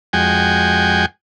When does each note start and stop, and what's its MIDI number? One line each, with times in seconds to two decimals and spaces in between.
0.13 1.06 41
0.13 1.06 56
0.13 1.06 66
0.13 1.06 79
0.13 1.06 80